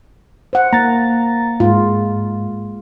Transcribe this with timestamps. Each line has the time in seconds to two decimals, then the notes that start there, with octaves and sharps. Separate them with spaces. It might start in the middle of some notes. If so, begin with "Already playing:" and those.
0.53 C5 F#5
0.73 A#3 A#5 A6
1.60 G#2 G#3 F4